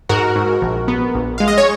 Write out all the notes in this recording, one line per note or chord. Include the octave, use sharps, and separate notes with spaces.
G#2 F#4 A#4
G#2
A#1
B3
A#1
G#3 F5
D#5
C#5